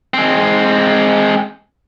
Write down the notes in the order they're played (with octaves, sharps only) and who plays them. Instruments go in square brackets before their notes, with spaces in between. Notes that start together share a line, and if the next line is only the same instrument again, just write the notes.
[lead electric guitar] G#3 C4